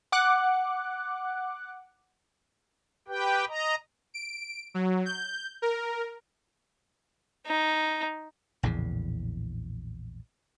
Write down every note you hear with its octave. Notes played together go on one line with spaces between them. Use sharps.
F#5 D6 F#6
G4 B4 G5
D#5 A#5
D7
F#3
G6
A#4
D#4
A#1 E2 A2 C#3